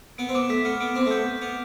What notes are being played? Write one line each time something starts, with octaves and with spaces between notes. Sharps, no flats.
B3 D7
C4
B3 D6
A3 B6
B3 F6
B3 D7
C4 D6
A3
B3 G6
G6
B3 F7